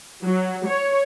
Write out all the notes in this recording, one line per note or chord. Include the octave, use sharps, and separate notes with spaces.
F#3
C#5